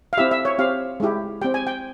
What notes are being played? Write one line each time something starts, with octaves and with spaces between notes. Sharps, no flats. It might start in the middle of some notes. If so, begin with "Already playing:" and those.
F5
C4 E4 G4 E5
E5
C#5
C4 G4 F5
G#3 E4 G4
C4 G4 G5
G#5
G5